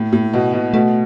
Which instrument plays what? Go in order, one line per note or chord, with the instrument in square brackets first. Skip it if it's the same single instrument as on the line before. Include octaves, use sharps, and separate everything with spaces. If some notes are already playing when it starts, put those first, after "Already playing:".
Already playing: [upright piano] A2
A2
B2
B2
[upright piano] B2 [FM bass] A3